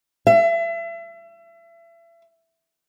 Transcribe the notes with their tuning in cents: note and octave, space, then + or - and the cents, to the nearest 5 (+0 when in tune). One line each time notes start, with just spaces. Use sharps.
E5 +35